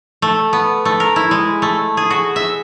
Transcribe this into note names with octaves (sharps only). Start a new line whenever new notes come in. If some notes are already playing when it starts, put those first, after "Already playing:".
A3
B3
A3
A#4
E4
G#3
A3
G#4
F#4
E5